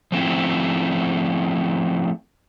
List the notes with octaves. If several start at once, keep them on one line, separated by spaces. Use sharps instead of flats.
F3 A3 C4 C#4 E4